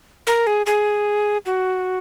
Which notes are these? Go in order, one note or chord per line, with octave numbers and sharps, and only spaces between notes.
A#4
G#4
G#4
F#4